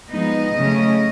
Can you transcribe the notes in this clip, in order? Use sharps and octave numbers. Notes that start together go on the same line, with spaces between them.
F3 G#3 B3 D#4 D#5
C#3 F#3 A3 C#4